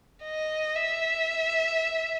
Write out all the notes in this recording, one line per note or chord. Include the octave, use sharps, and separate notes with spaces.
D#5
E5